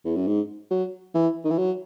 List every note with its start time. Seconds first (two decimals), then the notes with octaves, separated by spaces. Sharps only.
0.05 E2
0.16 F#2
0.27 G#2
0.71 F#3
1.15 E3
1.44 D#3
1.50 E3
1.58 F#3